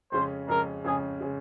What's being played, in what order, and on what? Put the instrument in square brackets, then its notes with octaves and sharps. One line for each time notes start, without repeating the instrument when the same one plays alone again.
[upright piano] F2 C#3 G#3 C#4 [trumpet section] C5
[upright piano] F2 C#3 G#3 C#4 [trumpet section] A#4
[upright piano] F2 C#3 G#3 C#4 [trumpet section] G#4
[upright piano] C#3 G#3 C#4